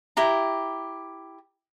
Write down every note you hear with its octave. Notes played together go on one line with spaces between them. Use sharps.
E4 G4 A#5